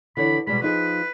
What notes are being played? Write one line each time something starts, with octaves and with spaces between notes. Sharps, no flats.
D3 E3 C#5 B5
B2 G3 G#3 B5
F3 D#4 G#4 B4